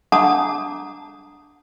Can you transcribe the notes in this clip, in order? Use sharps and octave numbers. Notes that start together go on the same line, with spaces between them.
D4 F#5 A5 A#5 D6 D#6